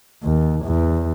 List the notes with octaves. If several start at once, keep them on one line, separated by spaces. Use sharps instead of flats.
D#2
E2